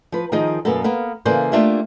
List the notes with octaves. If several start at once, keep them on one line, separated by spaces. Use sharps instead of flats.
F3 B4
D#3 F3 D#4 G#4 D#5
F#2 B2 A#3 B3 A4
A#3 B3 F5
C#3 E3 A#3 A4 C5 D5
A3 A#3 D4 F4 G4 E5